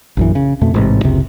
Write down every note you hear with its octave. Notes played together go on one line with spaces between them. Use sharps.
A#1 F#2 E3
C#3
F2 B2 A3
A1 G#2 C3
F#1 C#2 C3